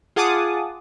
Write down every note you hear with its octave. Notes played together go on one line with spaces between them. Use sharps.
F4 G#4 F#5 A5 D6 D#6